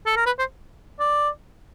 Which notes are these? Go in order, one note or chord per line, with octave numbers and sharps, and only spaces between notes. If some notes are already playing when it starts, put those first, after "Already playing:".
A4
A#4
B4
C5
D5